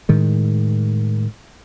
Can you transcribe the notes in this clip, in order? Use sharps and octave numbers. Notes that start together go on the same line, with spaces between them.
A2 D#3 G#3